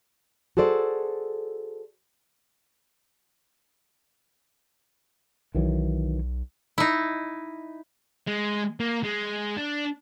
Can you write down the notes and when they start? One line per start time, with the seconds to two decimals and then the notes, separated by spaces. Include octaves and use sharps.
0.57 F#4 G#4 A4 C5 D5
5.55 B1 D#3 E3 F#3
6.78 D#4 E4
8.27 G#3
8.80 A#3
9.03 G#3
9.57 D4